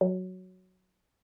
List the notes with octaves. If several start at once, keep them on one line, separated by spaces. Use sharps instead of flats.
F#3